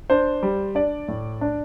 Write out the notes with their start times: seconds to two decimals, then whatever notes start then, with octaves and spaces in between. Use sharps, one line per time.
0.10 D4 C5
0.43 G3
0.75 D4 D5
1.08 A2
1.41 D4